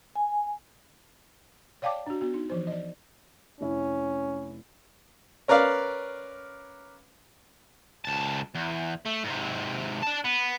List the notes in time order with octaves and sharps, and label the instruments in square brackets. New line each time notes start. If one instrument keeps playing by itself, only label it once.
[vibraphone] G#5
[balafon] C#5 D5 F5 G5 A5 D6
D4 F#4
B3 F#4
D#4
E3 F3 C5
D5 D#5
[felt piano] F1 E4 [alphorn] C#4
[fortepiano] C#4 A#4 B4 D5 F5
[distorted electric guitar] C#2 A5
E2
A3
G#2 C3
D4 A5
B3